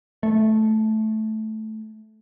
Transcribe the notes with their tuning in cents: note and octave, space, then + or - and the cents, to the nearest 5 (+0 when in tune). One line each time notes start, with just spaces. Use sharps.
A3 -10